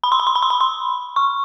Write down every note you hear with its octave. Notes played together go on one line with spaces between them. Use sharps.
B5
C6
B5
C6
B5
C6
B5
C6
C#6